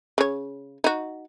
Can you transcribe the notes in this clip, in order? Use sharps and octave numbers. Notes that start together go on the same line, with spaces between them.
C#3 C#5
D#4 F#4